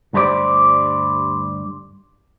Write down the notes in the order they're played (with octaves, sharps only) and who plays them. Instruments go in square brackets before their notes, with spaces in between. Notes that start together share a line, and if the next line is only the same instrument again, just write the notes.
[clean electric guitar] D2 G2 G3 C5 D5